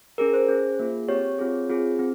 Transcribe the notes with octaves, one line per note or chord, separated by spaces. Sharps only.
C#4 G#4 A#4
C5
C#4 G#4
A#3 F4 G#4
C4 G4 C#5
C4 F4 G#4
C4 F4 G#4
C4